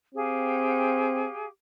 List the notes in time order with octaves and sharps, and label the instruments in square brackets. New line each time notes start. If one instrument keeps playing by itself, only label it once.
[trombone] C4 [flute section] G4 G#4 F5